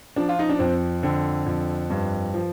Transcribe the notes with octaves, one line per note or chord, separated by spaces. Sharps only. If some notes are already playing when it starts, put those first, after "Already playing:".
F3 D4
F4
D#4
D4
F2 C4
D3 C4
F2
G2
F3